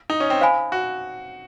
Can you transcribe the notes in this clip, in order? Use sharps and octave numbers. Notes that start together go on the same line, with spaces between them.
D#4
C#4
C4
C5 F5 G#5 B5
F#4